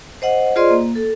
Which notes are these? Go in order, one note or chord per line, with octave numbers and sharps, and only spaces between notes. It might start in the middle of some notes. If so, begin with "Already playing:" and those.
C5 D#5 F#5
F4 G#4 C5 D5 D#5 C6
A#3
A4